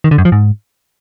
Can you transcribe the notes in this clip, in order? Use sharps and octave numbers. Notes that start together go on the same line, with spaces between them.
D#3
D3
F#2
F3
G#2